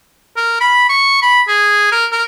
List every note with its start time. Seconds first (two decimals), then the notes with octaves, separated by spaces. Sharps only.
0.36 A#4
0.61 B5
0.89 C#6
1.22 B5
1.48 G#4
1.92 A#4
2.12 A#4